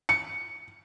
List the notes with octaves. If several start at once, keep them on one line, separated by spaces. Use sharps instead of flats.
C#7